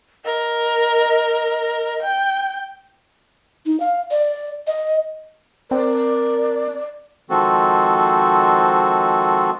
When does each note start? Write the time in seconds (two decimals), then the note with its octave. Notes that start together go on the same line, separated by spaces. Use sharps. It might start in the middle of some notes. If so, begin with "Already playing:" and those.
0.25 A#4 D#5
2.03 G5
3.66 D#4
3.80 F5
4.11 D5
4.67 D#5
5.71 C4 A#4 D5
7.30 D#3 F3 G#3 C4 F#4 A4